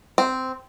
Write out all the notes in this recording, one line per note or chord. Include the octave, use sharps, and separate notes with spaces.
C4